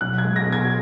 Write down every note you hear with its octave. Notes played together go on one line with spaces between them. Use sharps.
B1 F#6
G#6
G#3
A#6
B2
G#6